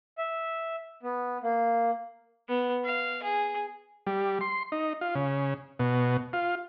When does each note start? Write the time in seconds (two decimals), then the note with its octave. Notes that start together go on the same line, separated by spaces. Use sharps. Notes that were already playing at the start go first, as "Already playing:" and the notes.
0.18 E5
1.03 B3
1.43 A#3
2.48 B3
2.84 F5
3.23 G#4
4.07 G3
4.41 C6
4.72 D#4
5.01 F4
5.15 C#3
5.79 B2
6.33 F4